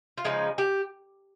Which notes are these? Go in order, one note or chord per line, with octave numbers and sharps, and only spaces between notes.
F4
C#3 F3 G#3 D#4
G4